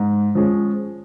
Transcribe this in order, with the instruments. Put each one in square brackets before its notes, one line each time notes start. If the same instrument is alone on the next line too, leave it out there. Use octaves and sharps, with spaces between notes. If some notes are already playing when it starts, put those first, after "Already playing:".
Already playing: [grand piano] G#2
F3 G#3 C#4